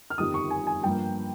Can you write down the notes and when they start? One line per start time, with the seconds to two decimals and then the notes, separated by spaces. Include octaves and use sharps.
0.10 F6
0.18 G1 F2 D#3 G3 D#6
0.34 C#6
0.50 G#5
0.67 G#5
0.83 G2 F3 A#3 G5